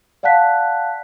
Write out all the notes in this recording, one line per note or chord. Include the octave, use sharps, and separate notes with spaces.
D5 F5 F#5 A5 F#6 B6